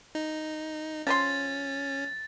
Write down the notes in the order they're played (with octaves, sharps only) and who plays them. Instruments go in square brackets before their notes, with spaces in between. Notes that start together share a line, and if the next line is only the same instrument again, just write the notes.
[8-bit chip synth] D#4
[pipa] F3 A#4 C6 [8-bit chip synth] C#4 [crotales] A6